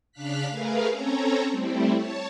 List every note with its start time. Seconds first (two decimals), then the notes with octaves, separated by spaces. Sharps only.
0.12 C#3 D4 F5 F6 F#6 B6
0.49 A3 G#4 A#4 B4 F5
0.89 C4 C#4 A4 C#5 A#5
1.50 G3 A3 C4 E4
1.94 C#5 A5